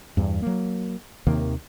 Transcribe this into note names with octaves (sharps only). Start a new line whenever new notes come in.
E2 G2
F#3 A#3
D#2 C3 D#3 A#3